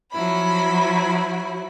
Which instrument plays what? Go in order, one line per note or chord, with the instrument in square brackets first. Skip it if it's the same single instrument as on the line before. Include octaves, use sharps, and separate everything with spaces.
[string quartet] F3 F#3 E4 B5